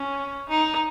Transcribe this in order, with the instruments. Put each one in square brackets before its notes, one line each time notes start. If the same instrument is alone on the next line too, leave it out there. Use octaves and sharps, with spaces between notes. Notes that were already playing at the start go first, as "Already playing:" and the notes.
Already playing: [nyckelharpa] C#4
D#4